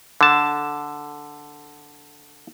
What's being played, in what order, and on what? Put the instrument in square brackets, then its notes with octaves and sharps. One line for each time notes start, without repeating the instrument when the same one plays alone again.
[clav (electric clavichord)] D3 A5